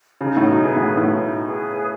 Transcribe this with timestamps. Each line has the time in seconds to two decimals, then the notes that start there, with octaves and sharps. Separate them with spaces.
0.20 C#3 D#4
0.37 A2
0.48 B2
0.62 G#4 B4
0.76 A2
0.97 A2
1.05 B2 D#4
1.46 G#4 B4